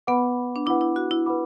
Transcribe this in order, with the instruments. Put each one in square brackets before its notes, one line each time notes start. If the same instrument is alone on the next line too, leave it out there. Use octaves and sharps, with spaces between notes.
[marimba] B3 [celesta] B4 F#5 B5 D6
[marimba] D4
[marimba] E4 [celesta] B4 F#5 B5 D6
[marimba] E4
F#4
E4
[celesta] B4 F#5 B5 D6